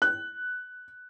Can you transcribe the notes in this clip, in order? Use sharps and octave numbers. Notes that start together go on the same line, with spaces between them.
F#6